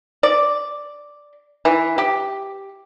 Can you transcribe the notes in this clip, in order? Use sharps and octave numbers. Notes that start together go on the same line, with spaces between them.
D5
E3
G4